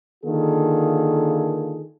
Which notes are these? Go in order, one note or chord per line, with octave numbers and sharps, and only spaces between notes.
D3 D#3 A#3 F4 G#4 A4